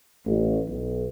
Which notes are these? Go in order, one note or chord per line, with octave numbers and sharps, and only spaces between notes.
A1
B1